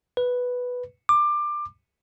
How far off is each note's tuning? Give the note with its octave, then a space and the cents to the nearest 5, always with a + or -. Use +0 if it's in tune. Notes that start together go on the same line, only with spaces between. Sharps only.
B4 +0
D6 +20